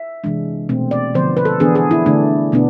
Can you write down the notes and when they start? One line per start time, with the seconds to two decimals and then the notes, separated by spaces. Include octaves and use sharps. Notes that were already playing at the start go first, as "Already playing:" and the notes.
Already playing: E5
0.24 C3 E3 G#3 D4
0.69 B2 A3 C4
0.91 D5
1.15 D3 F3 B3 C5
1.37 B4
1.45 A4
1.60 E3 B3 D4 G#4
1.75 G#4
1.91 E4
2.06 D3 A3 D4
2.52 B2 B3 D4